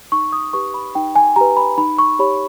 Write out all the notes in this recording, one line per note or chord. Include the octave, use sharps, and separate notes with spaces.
D#4 C#6
D#6
G4 B4 C#6
B5
D#4 G5
G#5
G4 B4 A#5
B5
D#4 B5
C#6
G4 C#5 B5